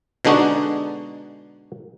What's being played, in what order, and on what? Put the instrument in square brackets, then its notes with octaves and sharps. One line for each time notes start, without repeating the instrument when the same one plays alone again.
[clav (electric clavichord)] B2 D3 G#3 D4 D#4 F#4